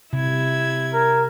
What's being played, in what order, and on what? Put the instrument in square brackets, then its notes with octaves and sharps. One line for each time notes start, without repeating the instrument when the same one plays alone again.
[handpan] C3 [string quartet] E4 G#6
[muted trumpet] A#4